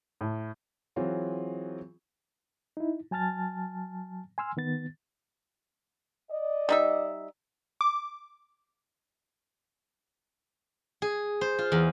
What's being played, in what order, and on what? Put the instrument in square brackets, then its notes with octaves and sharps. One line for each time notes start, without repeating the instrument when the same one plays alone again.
[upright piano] A2
[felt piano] E3 F#3 C4 F4 G#4 C#5
[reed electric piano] D#4 E4
F#3 G#5 A5 F6 A6
G#5 C6 E6 F6
D#3 B3 A6
[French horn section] D5 D#5
[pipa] G3 D#4 E5
[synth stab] D6
[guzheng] G#4
C5
F4
E2